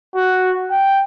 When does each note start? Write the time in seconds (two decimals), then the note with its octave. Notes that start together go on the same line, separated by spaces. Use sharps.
0.16 F#4
0.71 G5